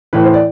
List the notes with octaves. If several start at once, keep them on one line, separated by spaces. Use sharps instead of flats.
A2 E3 B4
C5
D5